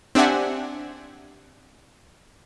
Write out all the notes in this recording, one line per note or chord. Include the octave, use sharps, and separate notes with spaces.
C4 D4 G4 E5 F#5 G#5